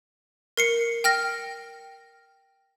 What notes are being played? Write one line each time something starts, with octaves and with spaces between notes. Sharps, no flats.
A#4 C7 C#7
G5 F6 A#6